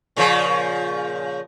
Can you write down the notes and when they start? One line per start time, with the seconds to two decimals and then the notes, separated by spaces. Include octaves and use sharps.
0.16 A#2 C#3 F3